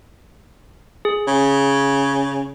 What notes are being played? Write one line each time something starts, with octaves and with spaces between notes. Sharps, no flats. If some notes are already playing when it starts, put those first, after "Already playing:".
G#4
C#3